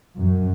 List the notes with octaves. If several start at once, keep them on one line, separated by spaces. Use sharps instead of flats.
F#2